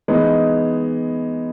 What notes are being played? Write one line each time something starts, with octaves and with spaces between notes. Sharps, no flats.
E3 G#3 B3 D#4